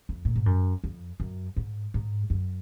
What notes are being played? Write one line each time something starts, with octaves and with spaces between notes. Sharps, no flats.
F2
A#2
G#2
F#2
F2
F#2
G#2
G#2
F#2